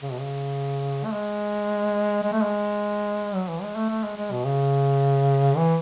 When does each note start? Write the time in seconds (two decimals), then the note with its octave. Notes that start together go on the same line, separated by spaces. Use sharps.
0.02 C#3
0.11 B2
0.21 C#3
1.05 A3
1.13 G#3
2.24 G#3
2.33 A3
2.42 G#3
3.35 F#3
3.49 E3
3.62 G#3
3.76 A3
3.90 A3
4.04 G#3
4.17 G#3
4.32 B2
4.45 C#3
5.56 E3